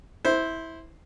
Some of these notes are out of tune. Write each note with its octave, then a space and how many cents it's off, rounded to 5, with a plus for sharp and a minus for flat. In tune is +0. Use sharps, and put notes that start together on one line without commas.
E4 -15 C5 +0